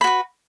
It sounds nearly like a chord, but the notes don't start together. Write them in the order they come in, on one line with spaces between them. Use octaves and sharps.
B5 F#4 B4